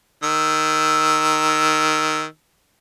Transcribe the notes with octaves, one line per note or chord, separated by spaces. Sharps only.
D#3 E6